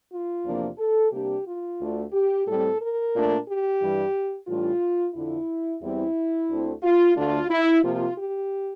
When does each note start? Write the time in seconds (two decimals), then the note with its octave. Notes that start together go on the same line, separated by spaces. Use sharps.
0.11 F4
0.45 E2 C3 F3 A#3 D4
0.78 A4
1.12 C3 G3 A#3 D4 G4
1.46 F4
1.79 D2 D3 A3 D4
2.12 G4
2.46 A2 G3 C4 A4
2.80 A#4
3.14 A#2 A3 D4
3.47 G4
3.81 G2 E3 G3
4.48 A2 E3 G3 D4 F4
5.15 F2 D3 F3 E4
5.82 E2 E3 G3 C4 E4
6.49 D2 D3 A3 C4
6.83 F4
7.16 D2 D3 A3 D4 F4
7.50 E4
7.83 C3 F3 A#3 F4
8.17 G4